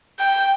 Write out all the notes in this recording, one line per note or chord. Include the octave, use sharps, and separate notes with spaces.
G5